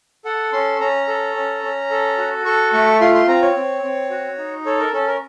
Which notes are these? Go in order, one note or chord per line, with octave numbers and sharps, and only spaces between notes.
A4 F#5
C#4 C6
C#4 A#5
A4
C#4
C#4
A4
F#4
A4 C#6
A3 C#6
F4 C6
C6
C4 A#5
C#5
C4
C4
F#4
D#4
A4 C#5
A#4
C#4 A4
A#4